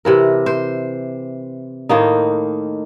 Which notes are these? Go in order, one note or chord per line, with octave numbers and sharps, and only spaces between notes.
C3 E3 A#4
C5
A2 D#3 A#3 D#4